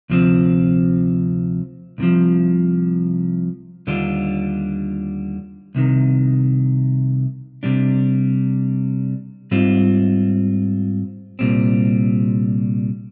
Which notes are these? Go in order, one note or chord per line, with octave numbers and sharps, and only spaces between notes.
D2 C3 F3 C4
C2 C3 F3
D#2 D3 G3 D4 F4
C2 C3 D#3
C3 G3 D4
G#2 G3 C4 F4
C2 A#2 G3 C4